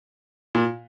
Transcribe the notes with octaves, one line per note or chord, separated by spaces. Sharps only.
A#2